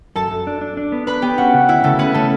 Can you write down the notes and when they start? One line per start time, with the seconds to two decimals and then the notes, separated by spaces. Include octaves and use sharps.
0.15 F#2 A4 A5
0.31 F#2
0.47 D4
0.61 D4
0.77 D4
0.92 B3
1.07 D4 B4 B5
1.22 B3 G4 G5
1.38 C#4 F#4 F#5
1.54 C#3
1.69 D2 E4 E5
1.84 C#3 A3 A4
1.99 B3 C#4 B4
2.14 A3 C#4 A4